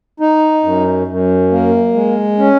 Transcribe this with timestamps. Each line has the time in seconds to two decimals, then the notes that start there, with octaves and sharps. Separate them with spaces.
0.20 D#4
0.64 F#2
1.07 F#2
1.51 A#3
1.94 G#3
2.39 C#4